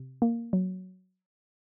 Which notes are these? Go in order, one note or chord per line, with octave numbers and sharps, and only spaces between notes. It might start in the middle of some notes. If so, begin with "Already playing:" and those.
Already playing: C3
A#3
F#3